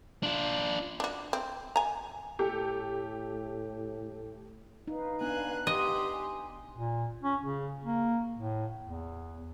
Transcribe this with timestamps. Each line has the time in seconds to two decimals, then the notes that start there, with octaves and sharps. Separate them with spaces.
0.23 D4 F4
1.00 D4 F#4
1.33 C4
1.76 G#5 A#5
2.39 A2 G4 A4
4.88 D#4 B4 F5
5.21 B3 D4 G#5 F#6
5.67 G4 D#5 C6
6.10 G#5
6.76 A#2
7.23 C#4
7.41 C#3
7.84 A#3
8.36 A2
8.82 E2